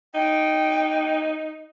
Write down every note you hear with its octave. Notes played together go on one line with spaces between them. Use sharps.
D#4 G5